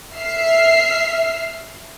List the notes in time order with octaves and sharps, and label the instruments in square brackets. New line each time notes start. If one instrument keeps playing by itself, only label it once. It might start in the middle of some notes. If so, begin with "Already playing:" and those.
[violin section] E5 F6 C7